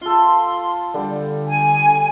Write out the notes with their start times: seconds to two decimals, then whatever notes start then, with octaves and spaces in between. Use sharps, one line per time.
0.01 F4 A4 C6
0.94 D3 G3
1.47 G#5